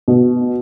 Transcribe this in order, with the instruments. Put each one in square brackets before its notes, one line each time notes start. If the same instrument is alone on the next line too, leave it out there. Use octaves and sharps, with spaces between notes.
[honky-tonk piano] B2